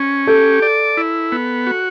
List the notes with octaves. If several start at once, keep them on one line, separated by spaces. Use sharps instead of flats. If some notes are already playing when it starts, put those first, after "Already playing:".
Already playing: C#4
G4 A4
D5
E4
B3
F#4